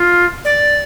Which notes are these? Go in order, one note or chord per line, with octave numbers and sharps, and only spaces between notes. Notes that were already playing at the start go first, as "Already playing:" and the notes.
Already playing: F4
D5